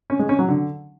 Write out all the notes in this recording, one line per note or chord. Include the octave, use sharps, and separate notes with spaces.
C#4
G#3
C#4
F#3
D3